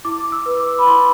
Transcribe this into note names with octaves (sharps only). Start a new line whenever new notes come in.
E4 D6
E6
B4
D6
B5
E4 C6